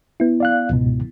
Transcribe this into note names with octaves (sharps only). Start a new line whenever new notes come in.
B3 E4
D5 F5 F#6
C#2 G#2 B2